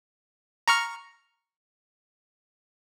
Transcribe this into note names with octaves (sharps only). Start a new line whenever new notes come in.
A#5 C#6 F6